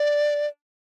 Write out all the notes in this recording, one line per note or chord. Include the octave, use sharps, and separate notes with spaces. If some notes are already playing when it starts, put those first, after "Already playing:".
Already playing: D5